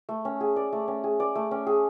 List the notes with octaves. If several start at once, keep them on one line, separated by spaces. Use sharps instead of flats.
A3
C#4
G#4
D5
A3
C#4
G#4
D5
A3
C#4
G#4